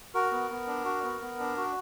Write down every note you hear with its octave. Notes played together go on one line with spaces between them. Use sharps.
F#4 A#4
B3
B3
D4
F#4
B3
B3
D4
F#4